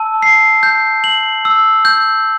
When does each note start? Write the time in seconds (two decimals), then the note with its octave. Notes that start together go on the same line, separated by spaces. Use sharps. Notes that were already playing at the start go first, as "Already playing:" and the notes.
Already playing: A5 E6
0.22 C7
0.63 G6
1.04 F#7
1.45 E6
1.85 G6